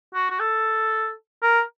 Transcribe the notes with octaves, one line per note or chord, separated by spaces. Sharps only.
F#4
F#4
A4
A#4